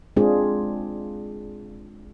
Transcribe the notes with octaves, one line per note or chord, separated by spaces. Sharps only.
G#3 C4 D4 F4 G#4